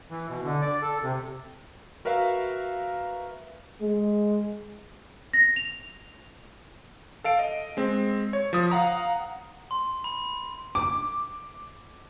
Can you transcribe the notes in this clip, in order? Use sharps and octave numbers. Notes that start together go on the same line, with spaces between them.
E3
B2
D3
D5
A4
C3
F#4 A#4 B4 E5 F5
G#3
A#6
F7
A4 F5 D7
D#5
G#3 C4
C#5
F3 D#6
F5 F#5 A#5 D#6
C6
B5
D6